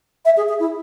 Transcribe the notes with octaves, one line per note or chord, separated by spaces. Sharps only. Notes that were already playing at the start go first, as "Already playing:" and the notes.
E5
G#4
G#4
E4